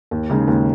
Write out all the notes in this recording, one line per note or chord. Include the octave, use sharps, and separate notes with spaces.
D#2
C#3 G#3 D#4
D#2